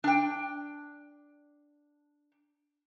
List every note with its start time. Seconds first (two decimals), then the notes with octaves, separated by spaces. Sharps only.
0.04 D4 G5